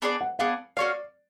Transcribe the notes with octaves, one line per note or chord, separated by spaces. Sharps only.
B3 D4 G#4 D5
F#5
B3 D4 G#4 D5 F5
C#4 F#4 C#5 D5 F5